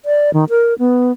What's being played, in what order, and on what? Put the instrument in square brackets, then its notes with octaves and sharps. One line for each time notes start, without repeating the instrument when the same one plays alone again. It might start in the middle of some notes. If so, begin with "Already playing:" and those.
[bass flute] D5
D#3
A#4
B3